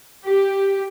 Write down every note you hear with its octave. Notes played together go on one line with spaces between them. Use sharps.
G4